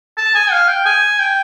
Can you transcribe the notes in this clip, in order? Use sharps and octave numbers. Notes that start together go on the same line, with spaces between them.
A5
G#5
F5
G5
G#5
G5